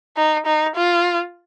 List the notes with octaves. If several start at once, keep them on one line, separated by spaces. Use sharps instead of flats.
D#4
D#4
F4